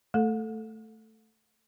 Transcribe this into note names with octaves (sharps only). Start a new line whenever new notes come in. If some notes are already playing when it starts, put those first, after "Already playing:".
A3 A4